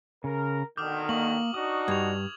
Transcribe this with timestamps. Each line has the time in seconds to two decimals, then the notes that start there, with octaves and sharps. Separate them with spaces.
0.24 C#3 A#4
0.77 B2 D3 D#3 D6 D#6 F6 G6
1.09 A#3 C#6 F#7
1.54 D4 D#4 F#4 D#6
1.88 G2 G#6 F7